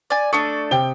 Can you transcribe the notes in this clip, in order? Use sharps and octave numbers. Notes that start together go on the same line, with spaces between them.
D5 G#5
A3 D4 A4 C#6 D#6 C#7
C3 G5 G7